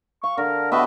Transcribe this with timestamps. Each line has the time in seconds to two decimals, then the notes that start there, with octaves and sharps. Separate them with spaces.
0.23 F5 C#6
0.38 D3 A#4
0.72 B3 F#4 G4 A4 B4 D#5 E5